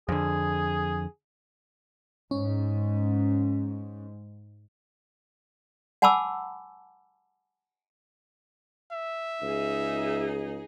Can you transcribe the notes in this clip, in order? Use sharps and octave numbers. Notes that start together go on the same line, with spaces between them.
F2 D3 G#4
G#2 C#4
F#5 G#5 A5 B5 D6 E6
E5
C#2 D#4 G#4